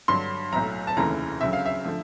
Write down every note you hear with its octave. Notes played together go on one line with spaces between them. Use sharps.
G2 D3 F#3 C6
B1 A2 F#3 A#5
A5
F1 D#2 C#3 E3 A3 A#5
D2 C#3 F#3 E5
F5
E5
D3 F3 A3